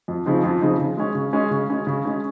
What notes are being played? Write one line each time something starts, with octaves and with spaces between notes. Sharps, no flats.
F2
C#3 F3 C4 D#4
F2
C#3 F3 C4 D#4
C#3
G#3 C#4
C#3
G#3 C#4
C#3
G#3 C#4
C#3
G#3 C#4